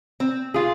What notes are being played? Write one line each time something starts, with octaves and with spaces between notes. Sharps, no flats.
C4
F4 G#4